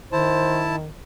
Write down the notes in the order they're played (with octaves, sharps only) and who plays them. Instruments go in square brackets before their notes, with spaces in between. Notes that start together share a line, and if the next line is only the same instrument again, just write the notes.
[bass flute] D#3 [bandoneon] E4 A5 [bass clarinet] C5